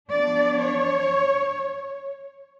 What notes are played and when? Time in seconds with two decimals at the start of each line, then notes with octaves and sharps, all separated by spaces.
0.11 F3 B3 D4 D5
0.59 C#5